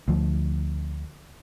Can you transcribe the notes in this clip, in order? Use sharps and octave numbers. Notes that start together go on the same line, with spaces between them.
D2 F3